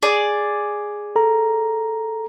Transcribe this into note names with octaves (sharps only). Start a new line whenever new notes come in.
G#4 D5
A4 A#5